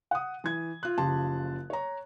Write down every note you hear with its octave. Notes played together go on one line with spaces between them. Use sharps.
F#5 D#6
E3 G#6
F4 F#6
F#1 C#3 F3 G4 A5 C6
C#5 A#5